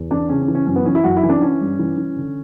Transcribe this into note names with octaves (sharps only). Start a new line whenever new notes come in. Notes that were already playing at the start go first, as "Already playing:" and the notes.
Already playing: E2
E3 D4
C#3 C#4
C#4
E3
C#4
F#2 C#4
B3
E3 C#4
E4
F#2 F#4
E4
E3
D4
E3 C#4
G2
E3
E3
D3